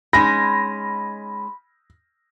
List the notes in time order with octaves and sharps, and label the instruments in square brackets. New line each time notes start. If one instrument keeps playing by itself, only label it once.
[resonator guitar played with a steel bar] G#3 C#4 D#4 [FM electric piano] B5 [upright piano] A#6